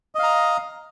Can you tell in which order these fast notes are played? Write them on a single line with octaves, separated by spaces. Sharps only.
D#5 F5 A#5